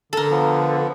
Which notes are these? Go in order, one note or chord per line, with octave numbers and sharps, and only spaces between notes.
D3 A4 A#4
F3 B3